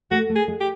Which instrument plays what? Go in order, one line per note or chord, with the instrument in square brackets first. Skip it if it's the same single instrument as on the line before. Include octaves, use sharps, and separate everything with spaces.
[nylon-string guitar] A3 [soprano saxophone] F#4
[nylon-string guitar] A3
[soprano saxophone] G#4
[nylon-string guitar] G#3
[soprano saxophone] G4